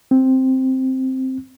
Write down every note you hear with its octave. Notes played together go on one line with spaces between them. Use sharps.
C4